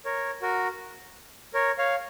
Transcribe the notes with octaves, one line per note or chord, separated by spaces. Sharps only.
A#4 C#5
F#4 A#4
A#4 C#5
C#5 F5